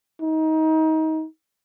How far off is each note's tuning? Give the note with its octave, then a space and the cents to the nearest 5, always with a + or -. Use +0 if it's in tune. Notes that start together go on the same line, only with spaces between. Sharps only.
D#4 +25